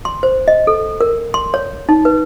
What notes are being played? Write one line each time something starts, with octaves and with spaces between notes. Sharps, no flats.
C6
C5
D#5
A4
A#4
C6
C#5
D#4
B4